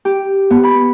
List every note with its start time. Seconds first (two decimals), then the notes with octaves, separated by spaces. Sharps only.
0.05 G4
0.50 B3
0.64 B5